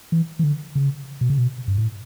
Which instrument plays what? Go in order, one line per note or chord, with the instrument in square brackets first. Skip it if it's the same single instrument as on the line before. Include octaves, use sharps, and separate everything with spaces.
[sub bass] E3
E3
D3
C#3
B2
C#3
B2
G2
A2